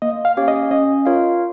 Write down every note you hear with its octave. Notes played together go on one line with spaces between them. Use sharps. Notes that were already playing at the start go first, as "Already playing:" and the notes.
A#3 D#5
F5
C#4 G4 C#5 F5
D#5
C#4 D#5
F4 A#4 C#5 F5